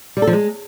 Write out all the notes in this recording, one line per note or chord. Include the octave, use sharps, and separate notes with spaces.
G3
A4
F3
G#3